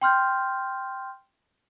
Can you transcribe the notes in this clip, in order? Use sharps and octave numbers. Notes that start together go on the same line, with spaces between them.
G5 C6 F6 G6